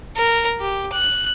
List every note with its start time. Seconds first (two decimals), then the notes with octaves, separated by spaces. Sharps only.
0.16 A#4
0.61 G4
0.93 F#6